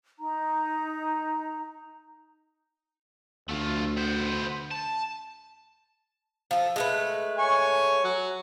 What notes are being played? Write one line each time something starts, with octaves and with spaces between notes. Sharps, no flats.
D#4 A#5
D2 A3 F4
B3 C5
A5
F3 A4
G#3 A3 B4
C#5 G#5 C#6
F#3